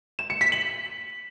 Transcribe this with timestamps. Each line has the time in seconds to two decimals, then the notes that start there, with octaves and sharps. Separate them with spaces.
0.19 E7
0.30 C#7
0.41 B6
0.52 F#7